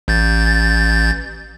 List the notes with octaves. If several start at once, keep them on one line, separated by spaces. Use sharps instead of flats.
A1 G6 A6